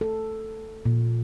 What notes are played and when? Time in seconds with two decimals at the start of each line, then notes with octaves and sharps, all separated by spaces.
0.01 A4
0.85 A#2